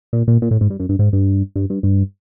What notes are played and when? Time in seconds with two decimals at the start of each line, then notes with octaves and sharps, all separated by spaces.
0.13 A#2
0.28 A#2
0.42 A#2
0.51 A2
0.61 G#2
0.70 G2
0.80 F#2
0.89 G2
0.99 G#2
1.13 G2
1.56 G2
1.70 G2
1.83 G2